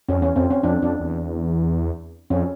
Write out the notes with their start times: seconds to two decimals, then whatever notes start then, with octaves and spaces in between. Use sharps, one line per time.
0.09 F2 C#4
0.22 E2 C#4
0.36 F2 C4
0.50 C#4
0.63 F2 D4
0.82 F2 D4
1.00 E2
2.30 F2 C#4